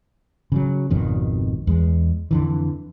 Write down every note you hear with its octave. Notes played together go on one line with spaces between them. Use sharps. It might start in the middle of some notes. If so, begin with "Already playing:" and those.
C#3 E3 F#3
G#1 F2 B2 D#3
E2 G#3
F2 D3 E3